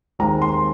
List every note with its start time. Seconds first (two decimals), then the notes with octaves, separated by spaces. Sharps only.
0.19 D#2 D#3 G#3 C4 A#5
0.42 C6